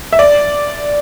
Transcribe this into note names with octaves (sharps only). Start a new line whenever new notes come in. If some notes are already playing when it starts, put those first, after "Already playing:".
E5
D5